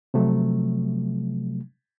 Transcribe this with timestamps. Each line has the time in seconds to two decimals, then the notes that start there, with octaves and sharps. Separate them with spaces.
0.14 C3 F3 F#3 A3